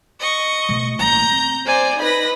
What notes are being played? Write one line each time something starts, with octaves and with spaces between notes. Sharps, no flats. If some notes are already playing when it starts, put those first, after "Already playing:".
D#5 C#6
B2 A3
A1 A#3 A#5 G6
C4
C5 D5 G#5
D#4 B4 B5 A#6